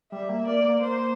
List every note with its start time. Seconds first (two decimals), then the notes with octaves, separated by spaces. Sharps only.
0.12 G3 E5
0.29 A#3
0.47 A#3 D5
0.64 A#3
0.81 A#3 C5